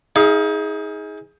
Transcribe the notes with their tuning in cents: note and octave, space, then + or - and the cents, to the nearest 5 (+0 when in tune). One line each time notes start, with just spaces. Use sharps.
D#4 +35 G#4 +0 F5 -20